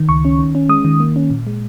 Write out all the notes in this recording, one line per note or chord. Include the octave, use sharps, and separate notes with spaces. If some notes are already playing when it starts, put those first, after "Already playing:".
Already playing: D#3
C#2 C#6
C#4
D#3
C#4
G#3 D#6
D#3
A#3
C#4
A#2
G#3